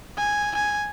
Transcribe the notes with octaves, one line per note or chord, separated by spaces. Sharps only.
G#5
G#5